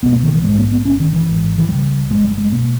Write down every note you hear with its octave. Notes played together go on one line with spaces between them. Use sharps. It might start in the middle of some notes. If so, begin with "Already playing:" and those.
C#2 B2 B3
A#3
D#3
E3
A#1 G#2 G#3
A#3
B3
G1 G2 C#4
D#3
E3
G#1 G#2
E3
C#2 C#3 G3
G1 G2 G#3
G3
G#3
B2 A#3